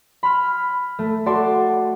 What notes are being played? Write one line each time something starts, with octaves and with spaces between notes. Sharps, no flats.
B5 C6 F6
A3
F#4 A4 D5 A5 C6 D6